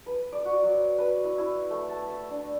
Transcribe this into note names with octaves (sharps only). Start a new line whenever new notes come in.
B4
D5
F#4
F#3
B4
E4
E4
A3
A5
E5
D4